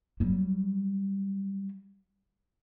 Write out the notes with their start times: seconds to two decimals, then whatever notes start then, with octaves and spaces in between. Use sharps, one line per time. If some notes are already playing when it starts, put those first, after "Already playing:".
0.20 F#3 G3